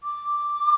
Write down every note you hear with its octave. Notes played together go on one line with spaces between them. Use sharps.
D6